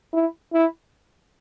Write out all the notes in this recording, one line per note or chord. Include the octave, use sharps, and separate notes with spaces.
E4
E4